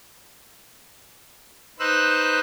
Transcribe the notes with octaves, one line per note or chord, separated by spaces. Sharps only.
D#4 B4 C5 E6 F#6